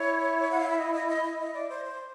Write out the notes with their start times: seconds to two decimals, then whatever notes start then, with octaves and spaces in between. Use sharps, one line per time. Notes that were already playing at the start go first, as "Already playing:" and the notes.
Already playing: E4 C#5
0.51 F#5
0.60 F5
0.70 E5
0.79 D#5
0.94 D#5
1.09 D#5
1.24 D#5
1.40 D#5
1.54 D5
1.70 C5
1.85 C5